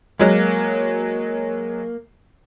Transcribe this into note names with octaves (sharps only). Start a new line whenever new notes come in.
F#3 G#3 A#3